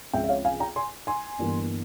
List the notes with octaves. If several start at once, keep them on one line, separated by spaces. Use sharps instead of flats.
C#2 C#3 F3 C4 E5 G5
E5
C#5 F5
F5 G#5
G5 A#5
G#5 C6
G#5 C6
G1 G2 E3 A#3